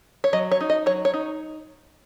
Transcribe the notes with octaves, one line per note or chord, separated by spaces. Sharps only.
C#5
F#3 D#5
C#5
D#4
D#5
F#3 C#5
C#5
D#4